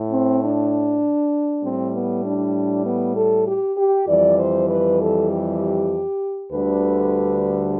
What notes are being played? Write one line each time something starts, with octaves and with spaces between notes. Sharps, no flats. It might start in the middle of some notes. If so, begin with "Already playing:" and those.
Already playing: A2
C4
D4
A2 G3 C4
B3
D4
B3
A4
G4
G4
F2 E3 G3 D5
C5
B4
A4
G4
D2 D3 G3 B4